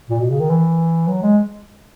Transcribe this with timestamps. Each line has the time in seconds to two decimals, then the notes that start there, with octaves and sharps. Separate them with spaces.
0.10 A#2
0.20 B2
0.30 C#3
0.40 D#3
0.50 E3
1.08 F#3
1.23 G#3